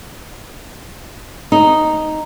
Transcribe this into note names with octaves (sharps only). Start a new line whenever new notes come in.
D#4